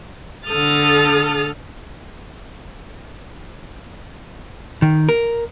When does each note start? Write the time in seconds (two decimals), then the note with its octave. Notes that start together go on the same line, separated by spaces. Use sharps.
0.48 D3 A4 D#6 F6 A6
4.82 D#3
5.09 A#4